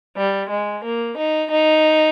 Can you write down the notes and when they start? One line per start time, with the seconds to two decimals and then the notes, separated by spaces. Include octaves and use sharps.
0.17 G3
0.51 G#3
0.84 A#3
1.18 D#4
1.52 D#4